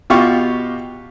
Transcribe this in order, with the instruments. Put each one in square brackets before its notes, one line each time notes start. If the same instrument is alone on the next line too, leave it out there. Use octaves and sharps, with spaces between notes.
[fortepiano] B2 F4 G4 C#6